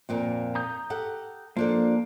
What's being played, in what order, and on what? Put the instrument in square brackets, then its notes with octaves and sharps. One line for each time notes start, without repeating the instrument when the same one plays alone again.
[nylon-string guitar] F2 A#2 A#3
[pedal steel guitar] A#5 D#6 G6
[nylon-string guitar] G4 A4 F#5
[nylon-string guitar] F3 D4 A4 [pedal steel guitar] A#3